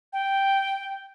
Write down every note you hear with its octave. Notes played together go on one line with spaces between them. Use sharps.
G5